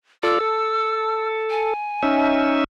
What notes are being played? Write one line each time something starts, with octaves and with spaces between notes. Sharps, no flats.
F4 A4 D5 E6
A4
G#5
C#4 D#4 E5